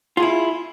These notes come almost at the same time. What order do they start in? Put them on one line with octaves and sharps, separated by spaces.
F4 G#4 E4